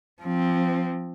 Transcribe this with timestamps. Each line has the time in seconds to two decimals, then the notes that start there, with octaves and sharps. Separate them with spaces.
0.22 F3 C4